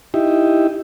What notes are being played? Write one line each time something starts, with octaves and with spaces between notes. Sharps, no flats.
D#4 E4 G4